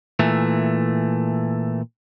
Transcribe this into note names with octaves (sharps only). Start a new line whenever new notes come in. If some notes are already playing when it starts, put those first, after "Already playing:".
A#2 E3 A3